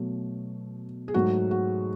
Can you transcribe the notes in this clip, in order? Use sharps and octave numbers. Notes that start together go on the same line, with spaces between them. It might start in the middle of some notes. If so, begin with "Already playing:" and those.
Already playing: B2 F#3 A3
G#4
G#2 F#3 A3 F#4
F#4